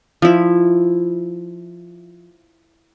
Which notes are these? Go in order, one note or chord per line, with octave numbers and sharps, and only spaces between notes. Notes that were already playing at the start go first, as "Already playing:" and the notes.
F3 E4